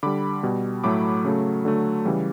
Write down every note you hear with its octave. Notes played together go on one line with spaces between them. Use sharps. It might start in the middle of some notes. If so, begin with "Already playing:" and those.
D3 G3 B5 D6
B2 G3
A2 F#3 A3 B5 D6
C#3 F#3 A3
D3 F#3 A3
C#3 E3 G3